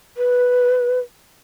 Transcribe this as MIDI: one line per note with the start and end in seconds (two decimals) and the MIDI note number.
0.17 0.99 71